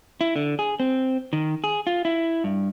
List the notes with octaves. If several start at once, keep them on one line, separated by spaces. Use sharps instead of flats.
E4
D3
G#4
C4
D#3
G#4
F4
E4
G2